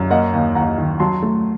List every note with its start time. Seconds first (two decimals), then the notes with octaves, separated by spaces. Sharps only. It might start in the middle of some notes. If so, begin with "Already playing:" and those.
Already playing: F#2
0.10 A#3 D#5 F#5
0.33 D#2
0.55 D#2 F#5 A#5
0.78 D#3
1.00 F#3 A5 C6
1.22 A3